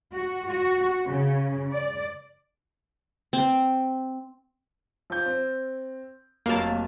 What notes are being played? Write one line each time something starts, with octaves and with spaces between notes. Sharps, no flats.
F#4
F#4
C#3
D5
C4
F3 G6
C4
F1 F#3 A#3 A5 F7